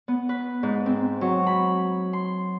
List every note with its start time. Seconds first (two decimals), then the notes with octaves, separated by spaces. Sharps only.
0.08 B3
0.29 B4
0.63 G#2
0.86 C4
1.21 F#3
1.47 B5
2.13 C6